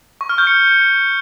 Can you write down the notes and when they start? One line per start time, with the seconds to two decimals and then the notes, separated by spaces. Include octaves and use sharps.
0.21 C#6
0.29 F6
0.38 G6
0.47 C#7